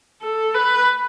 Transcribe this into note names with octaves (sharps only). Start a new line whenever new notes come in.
A4
B4